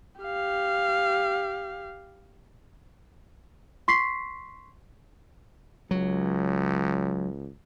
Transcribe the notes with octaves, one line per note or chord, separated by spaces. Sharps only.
G4 F5
C6 C#6 B6 C7
C#2 F#3